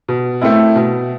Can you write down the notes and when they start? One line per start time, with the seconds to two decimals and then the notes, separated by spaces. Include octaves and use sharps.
0.08 B2
0.41 A3 C4 E4
0.76 B2